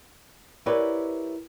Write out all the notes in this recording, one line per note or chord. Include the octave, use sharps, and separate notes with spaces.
E4 G4 A#4 B4 C#5 D5